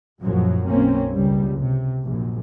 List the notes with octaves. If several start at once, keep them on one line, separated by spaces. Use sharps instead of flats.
A#1 F#2 A2 F3 F#3
B1 F#2 A#3 C4 C#4
C#2 G3
C3
A#1 F#2